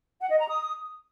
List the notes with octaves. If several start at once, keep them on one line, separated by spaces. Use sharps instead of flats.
F#5
D#5
A#5
D#6